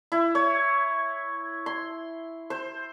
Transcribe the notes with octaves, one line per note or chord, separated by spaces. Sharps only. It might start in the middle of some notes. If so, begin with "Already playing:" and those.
E4
C#5
C6
C5